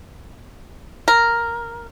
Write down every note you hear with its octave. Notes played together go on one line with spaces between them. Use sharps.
A#4